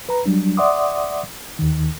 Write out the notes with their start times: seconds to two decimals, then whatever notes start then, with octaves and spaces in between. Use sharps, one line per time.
0.09 B4 A#5
0.26 F#3 G3 D4
0.57 D5 E5 F#5 C6 D6 D#6
1.59 D#2 D#3